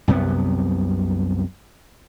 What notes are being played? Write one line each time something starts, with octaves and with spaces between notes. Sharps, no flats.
C2 F#2 C3 B3